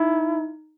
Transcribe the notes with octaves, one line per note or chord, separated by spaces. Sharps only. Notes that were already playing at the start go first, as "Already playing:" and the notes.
Already playing: D#4 E4